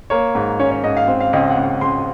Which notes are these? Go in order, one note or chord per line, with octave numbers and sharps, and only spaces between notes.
A#3 C#5
G#2
C#4 C#5
C#5
G#2 D#5
F5
C4
F5
C#2 D#5
D#5
F#5
C#2 F5
C#2 C6